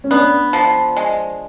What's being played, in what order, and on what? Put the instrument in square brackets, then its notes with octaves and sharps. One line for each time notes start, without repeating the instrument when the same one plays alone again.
[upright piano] C#4
[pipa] B3 [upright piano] D4
[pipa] F3
G#3